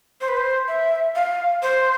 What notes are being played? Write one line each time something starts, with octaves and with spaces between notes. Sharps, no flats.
C5
B4
C5
E5
F5
C5